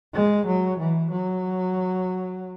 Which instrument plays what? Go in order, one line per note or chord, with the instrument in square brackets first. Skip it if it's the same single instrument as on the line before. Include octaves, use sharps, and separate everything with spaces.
[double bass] G#3
F#3
E3
F#3